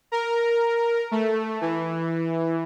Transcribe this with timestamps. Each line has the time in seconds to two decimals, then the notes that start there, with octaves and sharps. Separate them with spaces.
0.12 A#4
1.11 A3
1.61 E3